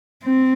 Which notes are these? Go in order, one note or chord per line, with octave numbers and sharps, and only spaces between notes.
C4